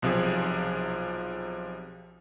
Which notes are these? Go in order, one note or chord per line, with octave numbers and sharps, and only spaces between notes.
B1 C3 F3 G#4